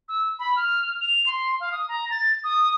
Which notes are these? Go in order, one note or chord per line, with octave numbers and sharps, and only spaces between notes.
E6
B5
F6
F7
C6
F5
D#6
A#5
A6
D#6